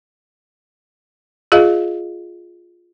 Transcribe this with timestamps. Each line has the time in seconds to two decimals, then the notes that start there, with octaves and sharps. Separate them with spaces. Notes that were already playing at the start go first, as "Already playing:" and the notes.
1.52 F4 G#4 D#5 F5